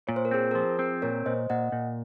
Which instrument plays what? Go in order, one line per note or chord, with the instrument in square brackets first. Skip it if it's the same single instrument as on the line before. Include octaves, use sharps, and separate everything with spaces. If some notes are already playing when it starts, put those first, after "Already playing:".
[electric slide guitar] A#2 [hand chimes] C#5
[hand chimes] C5
A#4
[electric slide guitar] C4 [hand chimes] G#4 C5
[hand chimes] A#4
[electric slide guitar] F3 [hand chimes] G#4 C5
[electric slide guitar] C4
[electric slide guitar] A#2 [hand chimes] A#4 C#5
[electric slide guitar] A#2 [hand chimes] C5 D#5
[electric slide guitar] A#2 [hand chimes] D#5 F#5
[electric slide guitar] A#2